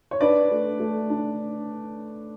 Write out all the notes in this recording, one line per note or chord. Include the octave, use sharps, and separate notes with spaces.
C#5
D4 B4 D5
A3
A3
D4